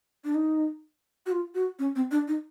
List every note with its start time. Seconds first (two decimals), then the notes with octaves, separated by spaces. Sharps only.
0.24 D4
0.35 D#4
1.26 F#4
1.31 F4
1.55 F#4
1.79 C#4
1.96 C4
2.11 D4
2.28 D#4